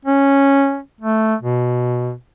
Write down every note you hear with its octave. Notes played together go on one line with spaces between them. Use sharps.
C#4
A3
B2